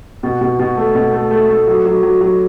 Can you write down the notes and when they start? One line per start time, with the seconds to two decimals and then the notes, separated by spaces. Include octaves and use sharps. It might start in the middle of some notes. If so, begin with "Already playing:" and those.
0.23 B2
0.41 B2
0.59 B2
0.77 A3
0.95 B2
1.13 A3
1.31 A3
1.49 A3
1.67 F#3
1.85 F#3
2.03 F#3
2.21 F#3